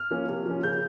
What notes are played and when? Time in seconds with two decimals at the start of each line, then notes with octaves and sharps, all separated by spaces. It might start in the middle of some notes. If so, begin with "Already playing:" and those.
Already playing: F6
0.11 F3 A#3 C#4
0.29 C3
0.46 F3 A#3 C#4
0.63 C#3 G6